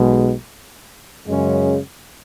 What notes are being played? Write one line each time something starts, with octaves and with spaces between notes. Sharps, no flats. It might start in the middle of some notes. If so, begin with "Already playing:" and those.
Already playing: B1 B2 G#3
F#2 C#3 G#3 C#4